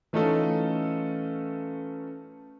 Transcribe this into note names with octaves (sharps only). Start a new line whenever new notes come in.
E3 A3 C#4 D#4 F4 A4